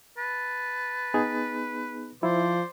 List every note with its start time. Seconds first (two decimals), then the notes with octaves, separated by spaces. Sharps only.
0.18 B4 A5
1.14 B3 D#4 G#4
2.23 F3 E4 C5 D5